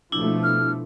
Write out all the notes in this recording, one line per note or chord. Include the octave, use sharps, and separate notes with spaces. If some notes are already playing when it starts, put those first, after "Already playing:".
B2 F3 A3 D4 E4
F6